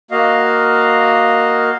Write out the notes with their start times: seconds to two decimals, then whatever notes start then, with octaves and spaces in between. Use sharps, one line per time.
0.11 A#3 F#4 D#5 F5